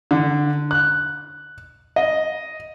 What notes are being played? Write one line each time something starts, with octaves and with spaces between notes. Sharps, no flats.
D3
F#6
D#5